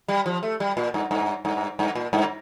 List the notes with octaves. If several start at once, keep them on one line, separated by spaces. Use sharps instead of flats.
G3
F3
A3
G3
A#2
G2
G2
G2
G2
A#2
G2